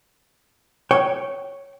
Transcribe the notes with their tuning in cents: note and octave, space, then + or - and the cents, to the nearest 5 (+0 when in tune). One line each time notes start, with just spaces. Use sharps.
C#5 +0 G5 -15